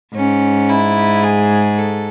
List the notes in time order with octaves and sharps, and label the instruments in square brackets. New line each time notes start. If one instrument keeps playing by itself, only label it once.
[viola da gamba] G#2 [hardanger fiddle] C#4
[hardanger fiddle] E4
G#4
A4